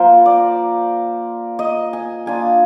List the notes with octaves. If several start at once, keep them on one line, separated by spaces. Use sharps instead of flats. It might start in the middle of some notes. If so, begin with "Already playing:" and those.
Already playing: F3 A#3 F4 A#4 C5
D5
D#5
G#5
A#3 D4 F4 G#5